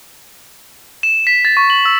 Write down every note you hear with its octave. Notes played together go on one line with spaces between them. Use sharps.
E7
B6
A6
C#6
F#7
E6